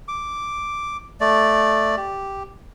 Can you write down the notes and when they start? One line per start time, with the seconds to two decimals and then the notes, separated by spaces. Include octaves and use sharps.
0.08 D6
1.20 A3 D5
1.97 G4